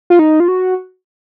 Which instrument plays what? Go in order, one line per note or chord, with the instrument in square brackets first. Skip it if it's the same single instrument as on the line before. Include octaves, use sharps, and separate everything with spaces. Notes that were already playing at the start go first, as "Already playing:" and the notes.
[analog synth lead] F4
D#4
F4
F#4